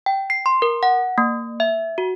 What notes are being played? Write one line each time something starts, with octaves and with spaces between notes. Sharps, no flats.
G5
C7
C6
A#4
F#5
A#3
E5
F#4